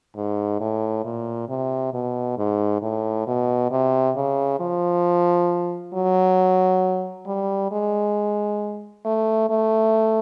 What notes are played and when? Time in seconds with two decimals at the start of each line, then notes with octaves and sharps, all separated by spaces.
0.15 G#2
0.60 A2
1.04 A#2
1.49 C3
1.93 B2
2.38 G#2
2.82 A2
3.27 B2
3.71 C3
4.16 C#3
4.60 F3
5.94 F#3
7.26 G3
7.72 G#3
9.05 A3
9.49 A3